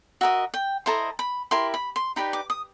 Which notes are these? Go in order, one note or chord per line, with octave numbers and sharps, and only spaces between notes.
F#4 A#4 D#5 E5
G5
E4 A4 C5 D#5 A#5
B5
E4 G4 A#4 C6
B5
C6
D#4 G4 B4 D5 B5
D6
D#6